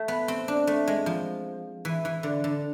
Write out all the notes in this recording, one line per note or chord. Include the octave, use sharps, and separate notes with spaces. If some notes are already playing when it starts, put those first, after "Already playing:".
Already playing: A3
B3
C4
D4
A3
G#3
F3
E3
E3
D3
D3